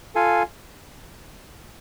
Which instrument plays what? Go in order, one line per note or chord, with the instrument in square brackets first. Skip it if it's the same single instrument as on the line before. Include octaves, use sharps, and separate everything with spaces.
[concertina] F4 A4 F5 G#5